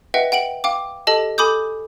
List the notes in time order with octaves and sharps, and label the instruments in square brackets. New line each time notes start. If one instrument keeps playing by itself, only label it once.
[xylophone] B4 D#5 E5 F#5 G5
F#5 G5 D7 F#7
F5 G5 D6
G4 A4 D#5 A5
A4 G#5 B5 D6 D#6 G6